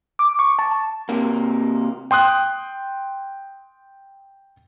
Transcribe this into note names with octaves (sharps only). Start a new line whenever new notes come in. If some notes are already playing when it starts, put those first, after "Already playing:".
D6
C#6
A5
C3 A#3
G5 C6 D#6 F#6